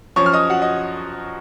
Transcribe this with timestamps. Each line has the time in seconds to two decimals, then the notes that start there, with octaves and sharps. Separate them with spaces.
0.16 F#2 F3 C#5 C#6
0.26 F6
0.33 D#5 D#6
0.50 F#4 F#5
0.62 D#5